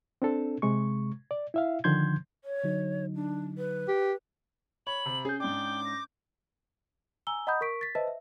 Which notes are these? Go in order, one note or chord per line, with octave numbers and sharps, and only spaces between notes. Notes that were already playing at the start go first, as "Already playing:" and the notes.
C4 D4 A4
C3 G#3 C#6
D5
E4 E5 F5
D3 D#3 F3 C6 G6 G#6
C#5
D3 F#3 D#4
D4
B4
G4
C#5 B5 F#7
C3
C#4 G#4 G6
G#2 D4 G5 D6
A#6
G#5 A#5 E6 G7
D#5 F#5 A#5 B5 D#6 G6
A#4 C#6 B6 D7
A6 B6
B4 C5 D#5 E5 A5
E5